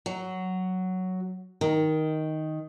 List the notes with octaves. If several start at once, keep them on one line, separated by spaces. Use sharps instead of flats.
F#3
D#3